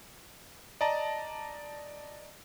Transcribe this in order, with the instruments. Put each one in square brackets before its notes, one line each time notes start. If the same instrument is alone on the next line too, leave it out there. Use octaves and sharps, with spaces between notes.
[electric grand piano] D5 D#5 A5 A#5